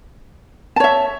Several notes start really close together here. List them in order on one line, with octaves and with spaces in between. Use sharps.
A5 C#5 E5